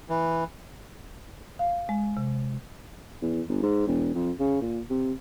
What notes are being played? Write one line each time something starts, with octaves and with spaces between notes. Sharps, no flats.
E3
F5
G#3
C3
E2
G1
G#2
E1
F2
C#3
A#2
C3